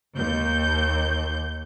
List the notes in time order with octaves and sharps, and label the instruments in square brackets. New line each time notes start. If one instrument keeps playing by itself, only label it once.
[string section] D#2 G6